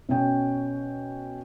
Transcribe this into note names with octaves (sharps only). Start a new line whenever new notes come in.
B2 C#4 G5